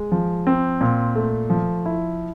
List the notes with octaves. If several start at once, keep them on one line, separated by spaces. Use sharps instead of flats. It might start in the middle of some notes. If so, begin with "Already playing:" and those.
Already playing: G#3
F3
C4
A#2
A3
F3
E4